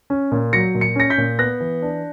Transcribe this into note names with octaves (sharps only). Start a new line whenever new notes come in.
C#4
A#2
F#3 A#6 C#7
A#2
C#7
C#4 A#6 C#7
G6 B6
A#2
B3 F#6 A#6
E3
D4